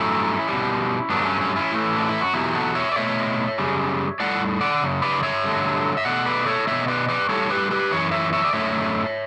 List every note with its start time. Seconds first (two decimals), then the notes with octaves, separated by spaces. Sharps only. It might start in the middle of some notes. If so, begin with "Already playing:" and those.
Already playing: G2 F#3 A3 C#4 E4
0.48 B2 G3
1.10 G2 F#3 A3 B3 D4
1.25 C#4
1.41 C#4
1.56 C#4 E4
1.72 A2 E3 A3
1.96 D4
2.09 E4
2.21 F#4
2.33 E2 B2 F#3 E4 G4
2.54 F#4 A4
2.75 C#5 E5
2.92 D5
2.96 B2 A3 C#5 E5
3.58 F#2 C#3 G3
4.20 A2 G3 D5 F#5
4.61 D5 F#5
4.82 F#2 C#3
5.02 B4 D5
5.23 C#5 E5
5.43 G2 D3 F#3 A3
5.97 E5
6.05 B2 A3 D5 F#5
6.26 B4 D5
6.46 A4 C#5
6.67 B2 A3 C#5 E5
6.88 B4 D5
7.09 B4 D5
7.29 A2 G3 A4 C#5
7.50 G4 B4
7.70 G4 B4
7.91 F#2 E3 C#5
8.11 C#5 E5
8.33 C#5 E5
8.45 D5
8.53 F#2 D3 A3 C#5 E5